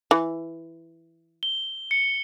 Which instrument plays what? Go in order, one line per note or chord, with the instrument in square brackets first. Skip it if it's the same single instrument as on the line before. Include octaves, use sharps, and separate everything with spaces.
[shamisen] E3
[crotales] G7
C#7